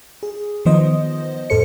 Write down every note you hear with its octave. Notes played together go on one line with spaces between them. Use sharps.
G#4
D#3 F3 B3 C5 D#5
F#2 A2 A4 C5 C#7